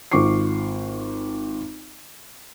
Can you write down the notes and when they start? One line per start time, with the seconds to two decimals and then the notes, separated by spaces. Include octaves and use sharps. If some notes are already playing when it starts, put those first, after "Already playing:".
0.12 G#1 F4 C#6 D6 C7